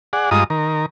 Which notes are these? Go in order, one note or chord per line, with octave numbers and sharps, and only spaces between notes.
G#4 D5 F#5
G2 G#3 F4 D#5 A#5 D#6
D#3 A#4